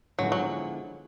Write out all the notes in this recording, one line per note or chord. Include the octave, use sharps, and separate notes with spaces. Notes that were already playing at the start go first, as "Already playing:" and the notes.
D3 F3 F#3 G#3 B3 E4
F#3